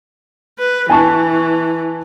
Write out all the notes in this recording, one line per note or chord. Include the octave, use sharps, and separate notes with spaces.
B4
E3 G#5 A5 C#6